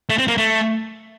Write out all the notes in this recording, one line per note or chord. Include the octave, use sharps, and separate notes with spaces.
A3
C4
A#3
A3